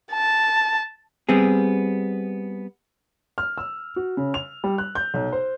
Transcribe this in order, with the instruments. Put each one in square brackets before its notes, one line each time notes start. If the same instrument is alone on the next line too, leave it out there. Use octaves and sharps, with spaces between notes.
[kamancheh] A5
[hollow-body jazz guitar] G3 B3 C4 G#4
[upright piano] F6
E6
F#4
C#3
F7
G3
F#6
G6
B1
C5